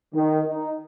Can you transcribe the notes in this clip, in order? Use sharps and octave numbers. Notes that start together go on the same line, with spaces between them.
D#3
D#4